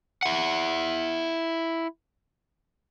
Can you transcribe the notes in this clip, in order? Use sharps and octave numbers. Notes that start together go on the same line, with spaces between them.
E4 F#5